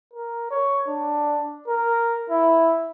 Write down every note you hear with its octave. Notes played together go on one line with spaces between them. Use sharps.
A#4
C#5
D4
A#4
E4